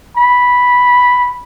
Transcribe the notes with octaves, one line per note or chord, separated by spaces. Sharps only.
B5